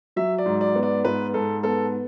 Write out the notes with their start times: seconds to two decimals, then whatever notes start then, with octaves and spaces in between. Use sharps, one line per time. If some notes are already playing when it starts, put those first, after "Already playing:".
0.16 F#3 E5
0.38 D5
0.46 G#2
0.61 D5
0.75 B3
0.83 D5
1.05 G#2 B4
1.34 G#2 A4
1.63 B3 A4